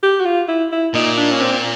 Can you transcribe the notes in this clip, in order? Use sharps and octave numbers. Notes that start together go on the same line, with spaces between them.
G4
F#4
F4
E4
E4
A#2 D#4
D4
C#4
C4